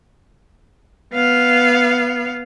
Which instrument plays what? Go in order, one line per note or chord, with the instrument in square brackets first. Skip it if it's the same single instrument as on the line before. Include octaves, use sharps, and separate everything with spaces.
[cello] B3 F5